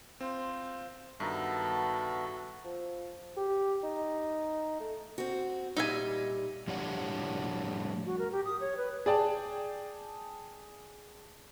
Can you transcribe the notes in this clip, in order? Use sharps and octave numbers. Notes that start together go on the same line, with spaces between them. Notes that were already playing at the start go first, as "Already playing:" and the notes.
C4 F4 C5
G2 D#3 B3 F#4 A4 E5 A5 A#5
F3
G4
D#4
A3
C4 F#4
A#2 G3 D#4 E5 G#5
A2 F3 G3 D4 C#5 F#5
F#4
A#4
G4
D#6
C#5
B4
G#4 D5 G5 A5